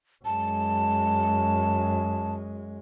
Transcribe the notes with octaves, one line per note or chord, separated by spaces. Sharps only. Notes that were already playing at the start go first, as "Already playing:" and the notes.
F#2 G#3 A5